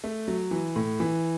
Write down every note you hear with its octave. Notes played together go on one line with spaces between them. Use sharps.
A3
F#3
E3
A2
E3